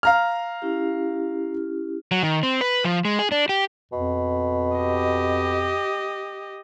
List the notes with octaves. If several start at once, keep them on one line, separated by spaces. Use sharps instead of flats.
F5 A#5 F6
C#4 E4 G4
F#3
D#3
C4
B4
F3
G#3
G#4
D4
G4
F2 B2
G4 D#5